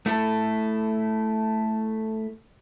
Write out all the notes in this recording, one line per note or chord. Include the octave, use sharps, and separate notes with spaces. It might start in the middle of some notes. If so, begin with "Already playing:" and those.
A3 E4 A4